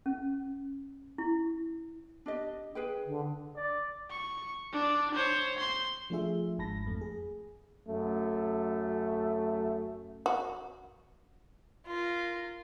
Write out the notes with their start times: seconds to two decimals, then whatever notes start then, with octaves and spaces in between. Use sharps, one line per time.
0.06 C#4
1.18 E4
2.26 D4 G4 D#5
2.75 G#4 B4 G5
3.06 D3
3.56 D5
4.10 C#6
4.73 D4 D5
5.15 C5 C#5
5.59 C6
6.10 F3 A3 D4 F4 G#4 E5
6.58 G#1 G#2 A5 B5 A#6
6.86 F2 A3
7.01 G#4
7.86 F#2 A3
10.26 F#4
11.85 F4 A#4